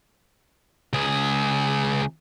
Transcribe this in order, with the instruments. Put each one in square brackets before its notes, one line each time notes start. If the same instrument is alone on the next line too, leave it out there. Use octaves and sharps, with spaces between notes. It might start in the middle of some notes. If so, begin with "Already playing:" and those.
[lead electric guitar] C#2 G#4